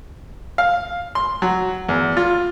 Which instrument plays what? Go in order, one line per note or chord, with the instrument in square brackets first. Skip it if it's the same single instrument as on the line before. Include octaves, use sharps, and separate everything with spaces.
[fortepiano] F5
C6
F#3
E2
F4